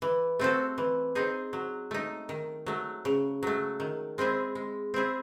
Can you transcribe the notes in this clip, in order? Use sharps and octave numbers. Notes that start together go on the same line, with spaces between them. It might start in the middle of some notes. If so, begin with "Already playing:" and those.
E3
A3 C4 F#4 A4
E3
C4 D#4 G#4
F#3
A3 D#4
D#3
F#3 A3
C#3
F#3 A3
D#3
G#3 C4 E4 G#4
G#3
C4 E4 G#4